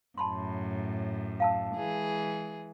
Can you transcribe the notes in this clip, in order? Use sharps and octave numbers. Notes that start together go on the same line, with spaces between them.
F#2 A2 A5 B5 C6
F5 A5 E6
E3 G#3 G#4